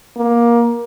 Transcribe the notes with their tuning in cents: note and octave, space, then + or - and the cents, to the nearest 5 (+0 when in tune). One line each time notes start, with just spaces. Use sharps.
A#3 +20